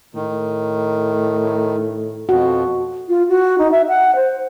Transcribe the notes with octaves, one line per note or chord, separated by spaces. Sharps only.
A2 D#3
F2 B2 F#4
F4
F#4
D#4
E5
F#5
C5